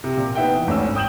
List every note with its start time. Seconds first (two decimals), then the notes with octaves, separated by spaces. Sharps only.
0.04 C3
0.17 A#2
0.35 B3 D#4 E5 F#5 G5
0.55 E3
0.67 G#1 D2 C#4 E6
0.95 G5 D#6 G6 E7 F#7